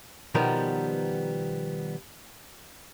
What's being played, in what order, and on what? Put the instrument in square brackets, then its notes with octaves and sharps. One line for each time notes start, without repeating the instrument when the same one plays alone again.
[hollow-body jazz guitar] B2 D#3 F3 G3 B3 A#4